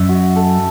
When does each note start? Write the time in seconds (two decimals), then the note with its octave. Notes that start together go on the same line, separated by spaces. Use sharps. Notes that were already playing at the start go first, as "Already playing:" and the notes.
Already playing: F#2 E5
0.09 F#4
0.36 A4